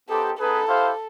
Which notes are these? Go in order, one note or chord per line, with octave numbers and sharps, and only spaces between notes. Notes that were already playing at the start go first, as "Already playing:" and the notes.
B3 D#4 G4 A4 C5
B3 D#4 G#4 A4 B4
E4 G4 C5 F5